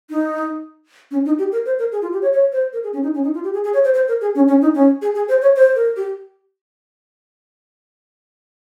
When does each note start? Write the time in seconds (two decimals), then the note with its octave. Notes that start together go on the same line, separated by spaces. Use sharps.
0.10 D#4
1.11 C#4
1.25 D#4
1.39 G4
1.52 A#4
1.66 C5
1.79 A#4
1.92 G#4
2.02 F4
2.13 G4
2.22 C#5
2.33 C#5
2.52 C5
2.73 A#4
2.83 G#4
2.93 C#4
3.03 D#4
3.14 C#4
3.23 D#4
3.34 F4
3.44 G4
3.54 G#4
3.64 G#4
3.74 C#5
3.84 C5
3.94 C5
4.08 A#4
4.21 G#4
4.35 C#4
4.48 C#4
4.61 D#4
4.74 C#4
5.02 G#4
5.15 G#4
5.28 C5
5.42 C#5
5.56 C5
5.75 A#4
5.96 G4